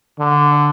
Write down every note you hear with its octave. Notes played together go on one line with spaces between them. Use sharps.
D3